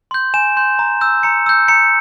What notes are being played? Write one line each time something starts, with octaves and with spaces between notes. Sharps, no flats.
C6 G6
G#5 E7
C6 G6
A#5
E6 G6
A#5 C#7
E6 G6
A#5 C#7